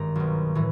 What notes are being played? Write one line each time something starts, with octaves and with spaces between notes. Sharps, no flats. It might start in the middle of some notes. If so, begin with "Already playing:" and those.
Already playing: G#1 G2 D#3 A#5
B1 B2
A2 E3